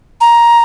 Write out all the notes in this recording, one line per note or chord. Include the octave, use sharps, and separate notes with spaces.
A#5